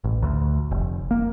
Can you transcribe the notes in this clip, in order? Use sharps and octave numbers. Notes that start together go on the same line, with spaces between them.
A1
D2
F1
A#3